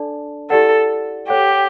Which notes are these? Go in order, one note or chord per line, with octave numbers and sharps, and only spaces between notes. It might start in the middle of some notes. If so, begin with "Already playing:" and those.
Already playing: D4 A4 D5 A5
E4 G4 A4 D5 F#5
G4 A4 C#5 F#5